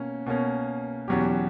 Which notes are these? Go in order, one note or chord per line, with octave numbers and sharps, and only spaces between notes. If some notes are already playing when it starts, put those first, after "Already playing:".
Already playing: B2 A#3 C#4
B2 A#3 C#4
E2 B2 F#3 C#4 G4